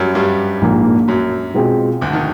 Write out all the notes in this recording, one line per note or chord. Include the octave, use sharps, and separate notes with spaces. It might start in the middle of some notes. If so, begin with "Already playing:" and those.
Already playing: F#2 F#3 G3
G2 G3
A#1 G#2 F3 A#3
F#2 F#3
B2 G#3 C4 F4 G#4
D2 D3
D#3